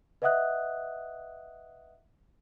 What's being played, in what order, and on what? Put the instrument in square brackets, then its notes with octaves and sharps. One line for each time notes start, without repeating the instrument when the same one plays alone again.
[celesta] B4 D#5 E5 F#5 D#6 F#6